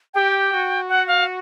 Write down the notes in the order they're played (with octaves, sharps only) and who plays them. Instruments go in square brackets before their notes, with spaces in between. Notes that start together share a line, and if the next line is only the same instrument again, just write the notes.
[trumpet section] G4 [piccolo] G5
[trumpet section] F#4
[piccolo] F#5
F5